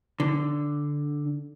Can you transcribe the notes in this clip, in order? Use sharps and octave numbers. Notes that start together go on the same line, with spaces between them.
D3